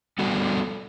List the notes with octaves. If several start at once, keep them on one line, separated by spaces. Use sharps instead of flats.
G3 B3 D4 F#4 A4